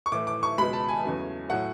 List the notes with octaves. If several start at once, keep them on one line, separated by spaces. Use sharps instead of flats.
C#6
A2 E3 A3 D6
D6
C#6
C#2 B2 G#3 B5
A5
G#5
E2 C#3 F#3 A3
A2 F#3 A3 F#5